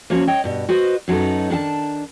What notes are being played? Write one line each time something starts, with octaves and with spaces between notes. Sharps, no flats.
F3 A#3 C#4 F#4 C#5
C#5 D#5 G5
G2 B2
F#4 B4 C5 D#5
F#2 F#3 B3 D#4 A4
D#3 D4 F#5 A5